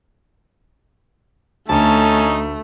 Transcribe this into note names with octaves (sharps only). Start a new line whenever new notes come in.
D2 A3 C#4 D#4 A5